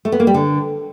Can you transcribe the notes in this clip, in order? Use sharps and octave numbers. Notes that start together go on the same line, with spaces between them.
A3
B3
A#3
G3
D3